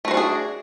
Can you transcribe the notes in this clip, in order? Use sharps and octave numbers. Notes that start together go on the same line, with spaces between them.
A3 D4 F#4 G#4 C5